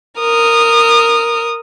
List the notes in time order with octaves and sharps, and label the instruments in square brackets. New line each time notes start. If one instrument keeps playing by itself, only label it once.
[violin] A#4 D#6